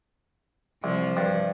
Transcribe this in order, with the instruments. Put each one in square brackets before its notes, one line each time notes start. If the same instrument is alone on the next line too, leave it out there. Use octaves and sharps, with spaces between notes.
[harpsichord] C2 [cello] F3
[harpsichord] G2